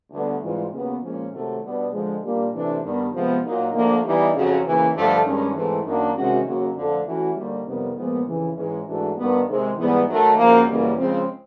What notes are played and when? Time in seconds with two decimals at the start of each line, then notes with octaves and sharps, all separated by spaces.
0.11 D2 D3 G3 B3
0.41 G#2 E3 G3 C4 F4
0.71 D#2 C#3 F#3 B3
1.02 A#2 F3 G#3 C#4
1.31 C3 D#3 F#3 A3
1.61 B2 G3 B3 D4
1.91 D3 F3 G#3
2.22 A#2 G3 A#3 D4 G4
2.52 C3 E3 A3 D4
2.82 G2 D#3 G3 B3
3.12 C3 F3 G#3 B3
3.43 A#2 F#3 A#3 D#4
3.73 D2 D3 F3 A#3
4.03 E3 G3 B3 D#4 G4
4.33 F2 C#3 F#3
4.63 D#2 C#3 E3
4.93 G2 D3 F3 A3
5.24 G2 D#3 G#3 C#4
5.54 G#2 E3 A3 C4 E4
5.84 F#2 D#3 F#3 A#3 D4
6.14 C3 D#3 G#3 C#4 F#4
6.45 D#2 C#3 F#3
6.74 F2 D3 F3 A3
7.05 E3 A3 C#4 F#4
7.35 D#2 D3 G3
7.65 F2 C3 D#3 G3 B3
7.96 A#2 F3 G#3 B3
8.26 F2 C#3 E3
8.56 G#2 E3 G#3 C#4
8.85 G#2 E3 A3 D4 F#4
9.16 G2 D#3 G3 B3
9.46 C3 D#3 G#3 C4
9.76 G#2 E3 G3 B3
10.07 D#3 F#3 A3
10.36 F#2 C#3 F3 A#3
10.67 F#2 C#3 E3 G3 A#3
10.97 C#3 F3 G#3 C4